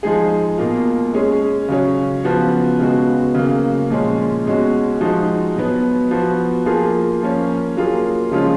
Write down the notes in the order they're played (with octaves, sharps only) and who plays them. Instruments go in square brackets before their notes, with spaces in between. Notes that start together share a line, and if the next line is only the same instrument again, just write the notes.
[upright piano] F3 G#3 D#4 G#4
B2 A#3 F4
G#3 C#4 G#4
C#3 F#3 C#4
C#3 F3 B3 F#4
C#3 G#3 B3 F#4
C#3 F#3 A#3
A#2 F3 G#3 C#4
B2 G#3 C#4 F#4
F3 G#3 D#4 F#4
B2 F#3 B3
F3 B3 F#4
F3 A#3 F4 G#4
F3 A#3 C#4
F#3 A#3 F4 G#4
C#3 F3 G#3 C#4 F4